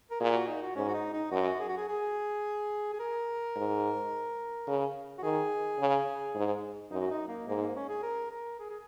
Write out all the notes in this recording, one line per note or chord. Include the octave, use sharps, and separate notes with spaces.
A#4
A#2 G#4
F#4
D#4
F#4
G#2 C#4
F#4
D#4
D#4
F#2 F#4
G#4
F#4
G#4
G#4
G#4
A#4
G#2
C#3
F#4
D#3 G#4
C#3
G#2
F#2 D#4
F#4
D#4
A#3
G#2 A#3
A#3
C#4
G#4
A#4
A#4
G#4
G#4